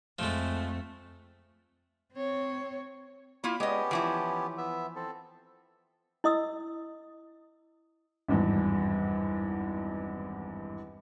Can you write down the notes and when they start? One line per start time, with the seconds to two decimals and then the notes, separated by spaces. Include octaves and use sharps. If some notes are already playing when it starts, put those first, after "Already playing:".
0.19 F2 F3 G#3 A3
2.13 C4 C#5
3.44 A#3 E4 F4 B5
3.60 G#3 B3 C#4 G4 D#5
3.91 E3 F3 E4
4.58 B3 E5
4.96 C4 A4
6.24 E4 D#5 D#6 E6
8.28 G#1 E2 G2